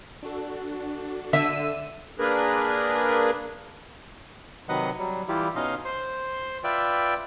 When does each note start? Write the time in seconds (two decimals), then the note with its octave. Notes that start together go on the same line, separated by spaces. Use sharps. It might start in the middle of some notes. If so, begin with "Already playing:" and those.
0.23 D4 F#4 A4
1.33 D3 E5 E6 D#7
2.19 A#3 D4 G#4 A#4 B4
4.69 C3 D#3 F#3 B4 D#5 F#5
4.99 F#3 G3
5.28 E3 G3 E4 F4 G4
5.56 B2 C#4 D#4 D#5 F5 C6
5.85 C5 C6
6.64 F4 B4 D5 E5 G5